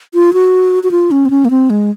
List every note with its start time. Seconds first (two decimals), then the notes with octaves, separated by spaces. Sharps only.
0.14 F4
0.33 F#4
0.83 F#4
0.91 F4
1.11 C#4
1.25 C4
1.30 C#4
1.45 A#3
1.50 C4
1.70 G#3